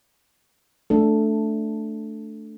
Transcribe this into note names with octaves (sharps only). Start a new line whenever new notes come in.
A3 D4 A4